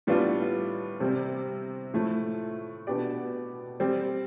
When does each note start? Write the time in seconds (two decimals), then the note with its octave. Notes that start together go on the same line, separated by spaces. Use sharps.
0.07 A2 G3 B3 D4 F4
1.00 C3 G3 C4
1.94 A2 F3 A3
2.87 B2 B3 D4 G4 D5
3.80 G3 C4 G4